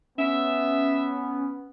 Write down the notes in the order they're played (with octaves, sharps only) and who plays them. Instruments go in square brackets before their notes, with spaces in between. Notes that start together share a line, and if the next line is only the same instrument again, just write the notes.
[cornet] B3 [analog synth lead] C#4 [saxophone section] E5